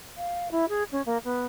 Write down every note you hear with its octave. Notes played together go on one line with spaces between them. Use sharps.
F5
E4
G#4
C#4
A#3
B3